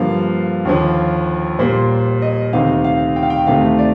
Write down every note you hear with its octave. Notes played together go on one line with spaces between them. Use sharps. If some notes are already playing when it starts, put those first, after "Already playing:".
Already playing: G2 D3 F3 A#3 F5
D#2 D3 F3
A#2 G3 A#3 C5
D#5
D2 C3 D#3 F5
F5
G5
F5
G5
D2 C3 D#3 A3 F5
D5